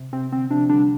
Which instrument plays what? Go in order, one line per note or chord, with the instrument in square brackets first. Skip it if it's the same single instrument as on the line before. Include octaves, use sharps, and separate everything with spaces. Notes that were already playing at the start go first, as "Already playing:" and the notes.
Already playing: [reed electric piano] C3
[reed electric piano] C3 [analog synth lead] C4
[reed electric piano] D3 [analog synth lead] C4
[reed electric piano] C3 F3 [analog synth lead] D4
[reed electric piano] D3 G3 [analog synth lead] D4